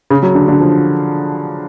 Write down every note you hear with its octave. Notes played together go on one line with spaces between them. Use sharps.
C#3
F#3
D3
D3
F3